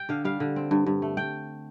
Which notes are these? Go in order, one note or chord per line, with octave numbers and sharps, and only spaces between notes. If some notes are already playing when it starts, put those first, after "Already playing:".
Already playing: G5
D3 F5
G3 F5
D3
C4
G2
G2
A3
G5